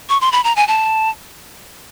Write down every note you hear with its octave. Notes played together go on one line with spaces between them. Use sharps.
C#6
C6
B5
A#5
G#5
A5